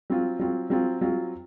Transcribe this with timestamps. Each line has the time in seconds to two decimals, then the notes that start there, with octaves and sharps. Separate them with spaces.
0.10 F#3 C4 F4
0.39 F#3 C4 F4
0.70 F#3 C4 F4
1.01 F#3 C4 F4